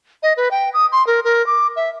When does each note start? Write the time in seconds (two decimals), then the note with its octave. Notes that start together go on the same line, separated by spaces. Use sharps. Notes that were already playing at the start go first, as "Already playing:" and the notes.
0.23 D#5
0.37 B4
0.51 G5
0.74 D#6
0.92 C6
1.07 A#4
1.24 A#4
1.47 D6
1.76 E5